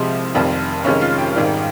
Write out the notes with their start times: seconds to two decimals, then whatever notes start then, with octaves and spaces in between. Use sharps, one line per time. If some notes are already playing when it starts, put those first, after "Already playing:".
Already playing: C2 C3 F3 G#3 C5
0.34 F1 F2 D#3 G3
0.84 F1 F2 D#3 G#3 C#4 C#5
1.01 F4 F5
1.18 G4 G5
1.35 G#1 G#2 D#3 G3